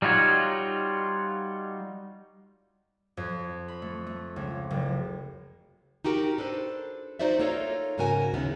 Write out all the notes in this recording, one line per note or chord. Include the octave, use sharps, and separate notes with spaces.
G3 D#4 F4 F#4 C#5
F2
B5
A3
A3
C#2
F#1
D#4 F#4 G4 A#4
D4 A4 B4 C5
D#4 F#4 C5 D5 E5
A#3 D#4 F4 A4 C#5
G#2 C#3 A#3 F#4 A#4 G#5
D#2 C#3 G#3 B3 D#4 E4